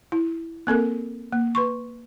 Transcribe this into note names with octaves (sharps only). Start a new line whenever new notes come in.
E4
A#3 C4 A4 A#4
A#3
B4 C6 C#6